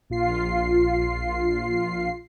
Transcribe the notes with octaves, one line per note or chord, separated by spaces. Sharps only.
A#1 F4 C7